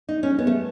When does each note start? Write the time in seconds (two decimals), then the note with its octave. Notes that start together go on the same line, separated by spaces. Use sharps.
0.09 D#4
0.23 C#4
0.39 B3
0.47 A3